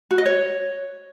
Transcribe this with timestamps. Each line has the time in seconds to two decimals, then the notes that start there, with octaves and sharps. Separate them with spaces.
0.11 F#4
0.18 D#5
0.26 C#5